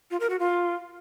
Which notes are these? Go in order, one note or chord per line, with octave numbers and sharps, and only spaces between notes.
F4
A#4
F#4
F4